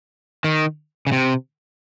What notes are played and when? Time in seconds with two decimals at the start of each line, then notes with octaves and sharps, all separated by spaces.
0.44 D#3
1.07 C#3
1.12 C3